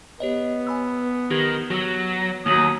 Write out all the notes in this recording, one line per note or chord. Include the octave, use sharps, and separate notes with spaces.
B3 G4 C#5 D#5
G#5 B5 E6
D#3 G4 G#6 A#6
F#3 F#4 E6
D#2 F#3 A#3 D#6 A#6 F#7